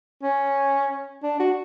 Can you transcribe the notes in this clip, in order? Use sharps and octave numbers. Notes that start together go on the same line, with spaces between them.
C#4
D4
F#4